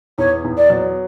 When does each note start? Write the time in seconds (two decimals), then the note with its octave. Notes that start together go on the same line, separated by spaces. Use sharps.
0.18 E2 C#5
0.44 E2
0.57 D5
0.70 F#3